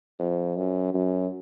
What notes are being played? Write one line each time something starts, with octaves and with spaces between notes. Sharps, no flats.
F2
F#2
F#2